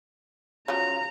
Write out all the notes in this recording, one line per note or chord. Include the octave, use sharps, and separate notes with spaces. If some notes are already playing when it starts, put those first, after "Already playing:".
C#3 F3 F#3 A#5